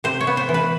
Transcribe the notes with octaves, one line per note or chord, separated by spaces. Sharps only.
C3 C5
C#5
B3
C5
E3
B4